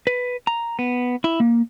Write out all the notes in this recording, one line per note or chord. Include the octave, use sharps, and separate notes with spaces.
B4
A#5
B3
E4
A#3